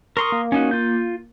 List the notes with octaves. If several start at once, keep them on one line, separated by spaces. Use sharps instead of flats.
A#4 C6 C#6 D#6
A#3
C#4 D#4 F#4
F4 G6